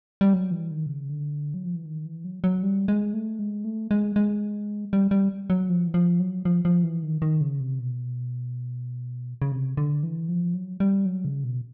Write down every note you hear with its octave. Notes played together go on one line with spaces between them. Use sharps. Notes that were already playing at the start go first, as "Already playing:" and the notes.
G3
F#3
E3
D#3
C3
C#3
D3
F#3
F3
E3
D#3
E3
F#3
F#3
G3
G#3
A3
G#3
A3
G#3
G#3
G3
G3
F#3
F3
E3
F3
F#3
F3
F3
E3
D#3
D#3
C#3
C3
B2
C#3
C3
D3
E3
F3
F#3
G3
F#3
C#3
B2